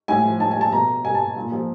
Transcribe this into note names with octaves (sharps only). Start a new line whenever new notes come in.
A2 G#5
F3
A2 A5
G#5
F3 A5
B2 A#5
B2 G#5
A5
A#2
F3